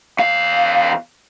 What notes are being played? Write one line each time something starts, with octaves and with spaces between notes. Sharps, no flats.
E2 F5